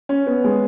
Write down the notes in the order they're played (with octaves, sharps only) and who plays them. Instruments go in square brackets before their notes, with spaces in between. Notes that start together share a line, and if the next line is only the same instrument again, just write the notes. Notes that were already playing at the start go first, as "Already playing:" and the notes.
[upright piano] C#4
B3
G#3